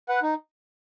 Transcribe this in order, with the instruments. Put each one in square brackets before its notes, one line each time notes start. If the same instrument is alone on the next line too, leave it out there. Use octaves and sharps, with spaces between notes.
[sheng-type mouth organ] B4 F#5
D#4